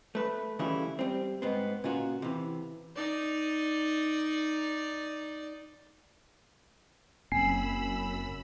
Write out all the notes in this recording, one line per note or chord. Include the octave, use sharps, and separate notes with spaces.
A3 B4
C#3 E3 G3 A3 E4 F4
G3 C4
G#2 B3 C4
A#2 C#3 F4 F#4
C3 E3
D#4 D5
F#1 F#2 A#3 C4 G#5 B5 E6 C7